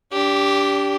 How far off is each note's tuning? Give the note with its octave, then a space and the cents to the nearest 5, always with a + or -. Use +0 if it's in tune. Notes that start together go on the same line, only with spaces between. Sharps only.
D4 -30 G4 +0